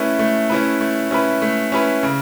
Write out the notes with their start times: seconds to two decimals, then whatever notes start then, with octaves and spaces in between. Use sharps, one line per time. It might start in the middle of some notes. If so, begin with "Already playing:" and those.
Already playing: A3 C#4 E4 B4
0.19 A3
0.50 C#4 E4 B4
0.81 A3
1.11 C#4 E4 B4
1.42 A3
1.72 C#4 E4 B4
2.03 C#3